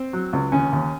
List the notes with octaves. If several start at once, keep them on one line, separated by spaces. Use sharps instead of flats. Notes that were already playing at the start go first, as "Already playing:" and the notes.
Already playing: C4
F#3
C#2
D#2 C#4
D#2